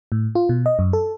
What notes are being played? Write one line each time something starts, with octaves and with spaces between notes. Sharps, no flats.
A2
F4
B2
D#5
F#2
A4